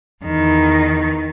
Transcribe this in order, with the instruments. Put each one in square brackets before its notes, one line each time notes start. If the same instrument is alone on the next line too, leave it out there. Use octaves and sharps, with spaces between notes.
[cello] E2 D#3